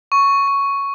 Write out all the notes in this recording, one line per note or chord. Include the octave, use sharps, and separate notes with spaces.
C#6
C#6